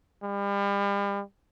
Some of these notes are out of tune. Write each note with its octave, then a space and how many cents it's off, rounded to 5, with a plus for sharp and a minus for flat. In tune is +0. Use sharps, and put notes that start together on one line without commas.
G3 +40